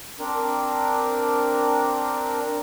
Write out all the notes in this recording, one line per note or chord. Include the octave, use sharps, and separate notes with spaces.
C4 D4 A#4